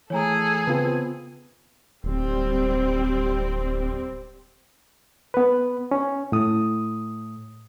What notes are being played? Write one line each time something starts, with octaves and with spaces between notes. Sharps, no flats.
E3 A3 G#4 A4 C#5 G#5 A#5
C#3 B3 C4 F4 B4
D1 G3 C4
B3 B4
C#4
A2 D#6